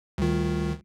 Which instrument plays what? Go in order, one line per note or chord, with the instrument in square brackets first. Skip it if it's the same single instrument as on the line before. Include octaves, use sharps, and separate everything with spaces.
[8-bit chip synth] D2 D#3 [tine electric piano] G3 F4